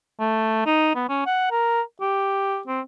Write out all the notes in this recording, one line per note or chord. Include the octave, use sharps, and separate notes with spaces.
A3
D#4
B3
C#4
F#5
A#4
G4
C4